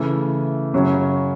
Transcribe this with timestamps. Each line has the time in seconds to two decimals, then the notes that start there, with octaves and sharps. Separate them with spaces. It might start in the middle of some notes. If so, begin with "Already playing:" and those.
Already playing: C#3 E3 A3
0.73 F#2 C#3 F#3 C#4